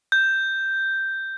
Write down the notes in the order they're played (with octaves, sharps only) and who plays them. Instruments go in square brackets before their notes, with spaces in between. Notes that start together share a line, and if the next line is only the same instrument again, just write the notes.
[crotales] G6